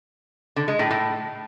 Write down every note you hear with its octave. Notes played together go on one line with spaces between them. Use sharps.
D3
G#3
A2
A2